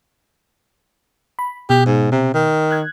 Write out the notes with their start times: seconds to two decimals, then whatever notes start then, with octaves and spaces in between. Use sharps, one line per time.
1.39 B5
1.70 B2 G4
1.86 G#2
2.12 C3
2.34 D#3
2.71 F#6 G#6